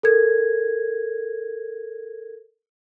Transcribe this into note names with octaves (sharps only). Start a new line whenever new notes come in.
A4 A#4 G#6